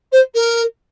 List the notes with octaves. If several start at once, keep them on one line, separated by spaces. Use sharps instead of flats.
C5
A#4